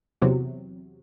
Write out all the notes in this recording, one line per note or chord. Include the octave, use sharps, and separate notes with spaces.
E2 C3 F#3